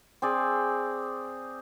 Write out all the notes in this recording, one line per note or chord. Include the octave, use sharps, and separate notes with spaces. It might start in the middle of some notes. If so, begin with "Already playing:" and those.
C4 G#4 D5